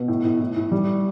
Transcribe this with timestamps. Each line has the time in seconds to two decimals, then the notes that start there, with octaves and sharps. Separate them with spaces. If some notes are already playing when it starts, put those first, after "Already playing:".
Already playing: B2
0.08 A2
0.25 A2
0.40 A2
0.56 A2
0.71 G3